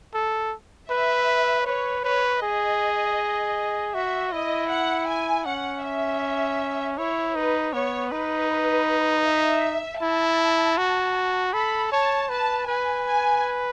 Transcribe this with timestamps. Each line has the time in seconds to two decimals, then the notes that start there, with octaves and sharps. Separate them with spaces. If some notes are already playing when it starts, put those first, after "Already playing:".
0.14 A4
0.90 B4 E5
1.66 B4 C#5
2.04 B4 C#5
2.42 G#4 D#5
3.94 F#4 E5
4.32 E4 D#5
4.70 F#5
5.08 G#5
5.46 C#4 F#5
5.84 E5
6.98 E4 C#5
7.36 D#4 B4
7.73 B3 C#5
8.11 D#4 B4
9.26 E5
10.01 E4 A5
10.77 F#4
11.53 A4 B5
11.92 C#5 A5
12.29 B4 A5
12.67 B4 G#5
13.06 G#5